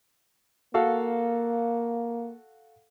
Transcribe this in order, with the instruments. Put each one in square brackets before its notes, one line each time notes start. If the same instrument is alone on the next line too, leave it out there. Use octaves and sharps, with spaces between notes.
[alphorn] A#3 [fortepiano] F#4 A4 F5